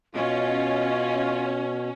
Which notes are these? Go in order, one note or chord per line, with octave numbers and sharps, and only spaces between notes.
B2 C#4 F4 D#5